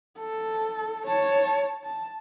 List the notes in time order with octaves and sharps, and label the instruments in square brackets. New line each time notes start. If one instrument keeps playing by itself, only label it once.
[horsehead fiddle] A4
C#5 A5
A5